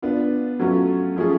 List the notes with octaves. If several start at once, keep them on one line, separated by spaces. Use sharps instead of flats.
B3 D4 F4
F#3 A3 C#4 F4
F3 A3 C#4 F4 G#4